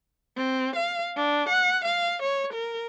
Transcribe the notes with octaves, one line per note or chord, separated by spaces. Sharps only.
C4
F5
D4
F#5
F5
C#5
A#4